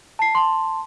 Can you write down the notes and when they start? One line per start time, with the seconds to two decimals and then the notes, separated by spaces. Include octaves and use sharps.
0.19 A5 C7
0.35 A5 C6